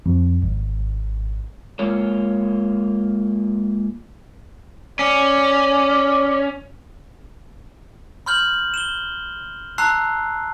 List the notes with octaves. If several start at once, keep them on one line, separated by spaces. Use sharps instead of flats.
F2
G#1
G#3 A#3 F4 C#5
C#4 D5
B5 C6 F6 G6 F#7
E7 G7
A5 A#5 C6 E6 F#6 C7